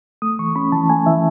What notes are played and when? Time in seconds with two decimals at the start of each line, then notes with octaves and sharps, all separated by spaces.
0.22 A3 D#6
0.39 E3 C#6
0.56 C#4 B5
0.72 E3 A5
0.90 A3 G#5
1.06 E3 E5